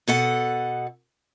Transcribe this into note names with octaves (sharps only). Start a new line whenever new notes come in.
B2 A4 F#5